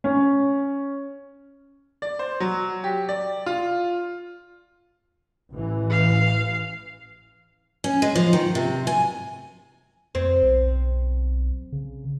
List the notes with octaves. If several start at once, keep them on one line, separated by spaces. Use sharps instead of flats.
C#4
D5
C5
F#3
G4
D5
F4
A1 E3
F5
C#4
G#3
F3
D#3
C3
G#5
F2 C4
B1
C#3